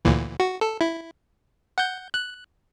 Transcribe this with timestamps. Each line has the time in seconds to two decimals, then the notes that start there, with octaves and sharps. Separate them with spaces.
0.05 D2 A#2 E3
0.40 F#4
0.61 A4
0.81 E4
1.78 F#5 G6
2.14 F#6